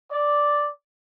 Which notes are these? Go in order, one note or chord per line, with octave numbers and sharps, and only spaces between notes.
D5